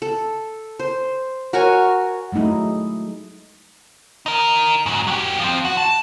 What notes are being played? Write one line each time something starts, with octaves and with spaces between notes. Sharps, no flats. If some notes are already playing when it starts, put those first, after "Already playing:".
A4
C5
F#4 A#4 C#5 G#5
F#3 G#3 A3 D#4 E4
D#4 A#4
G#2 F#3
F#3 G4
F3 C4
F#4
A5